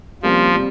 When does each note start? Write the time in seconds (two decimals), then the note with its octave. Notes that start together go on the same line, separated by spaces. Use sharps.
0.23 C3 F3 G3 A#3 C#4
0.54 C3 G3